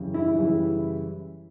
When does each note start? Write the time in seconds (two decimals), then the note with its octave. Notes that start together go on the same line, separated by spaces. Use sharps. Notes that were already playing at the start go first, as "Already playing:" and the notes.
Already playing: F#2 C#3 E3 G3
0.14 E4
0.35 F#2 C#3 E3 G3